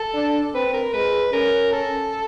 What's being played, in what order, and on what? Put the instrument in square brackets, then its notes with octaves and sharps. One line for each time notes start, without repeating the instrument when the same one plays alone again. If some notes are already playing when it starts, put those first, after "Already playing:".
Already playing: [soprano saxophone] A4
[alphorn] D4
[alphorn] C4 [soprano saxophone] B4
[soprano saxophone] A#4
[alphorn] G#3 [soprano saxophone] B4
[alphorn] C#4 [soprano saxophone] A#4
[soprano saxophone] A4